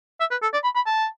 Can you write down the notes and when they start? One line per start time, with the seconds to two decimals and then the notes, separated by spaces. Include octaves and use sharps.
0.20 E5
0.31 B4
0.42 A4
0.53 D5
0.64 B5
0.75 B5
0.86 A5